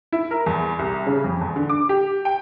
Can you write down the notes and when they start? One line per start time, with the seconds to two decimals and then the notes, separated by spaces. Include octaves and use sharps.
0.12 E4
0.31 A#4
0.46 E2
0.79 C2
1.07 C#3
1.24 F2
1.41 E2
1.56 D3
1.69 D6
1.89 G4
2.25 G5